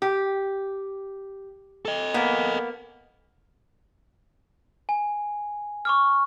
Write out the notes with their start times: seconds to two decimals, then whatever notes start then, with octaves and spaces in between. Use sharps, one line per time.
0.02 G4
1.85 A4 D#5
2.14 A#3 B3
4.89 G#5
5.85 C#6 D6 F6